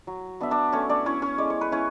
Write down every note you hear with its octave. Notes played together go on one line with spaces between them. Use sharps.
F#3
B3 D4 E5
D4 D5
A3 C#4 C#5
D4 D5
C#4 E4 C#5
C#4 C#5
G#3 D5
C#5
B4
C#4 E4 C#5